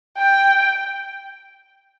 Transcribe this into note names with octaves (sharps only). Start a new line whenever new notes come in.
G5